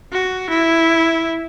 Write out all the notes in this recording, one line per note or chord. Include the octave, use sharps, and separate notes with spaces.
F#4
E4